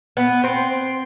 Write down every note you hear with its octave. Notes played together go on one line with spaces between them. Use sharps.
B3
C4